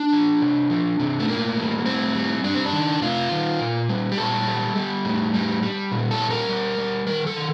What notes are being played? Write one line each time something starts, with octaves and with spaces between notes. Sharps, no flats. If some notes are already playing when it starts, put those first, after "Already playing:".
Already playing: D4
F3
C3
F3
C3
A3
A2 A#3
G3
A2 C4
G3
G3 D4
C4
D4
D#3
C3 F4
D#3
A#2
G3
G4
A#2 A4
G3
G3
A2
G3
G3
A#2
A4
G3
A#4
G3
G3
D#3 A#4
A4
D#3